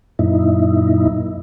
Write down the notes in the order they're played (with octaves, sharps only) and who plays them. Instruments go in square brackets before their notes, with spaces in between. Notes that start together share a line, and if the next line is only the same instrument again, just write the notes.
[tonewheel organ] F#2 A#2 D#4 E4